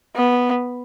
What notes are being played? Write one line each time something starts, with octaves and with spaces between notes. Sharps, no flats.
B3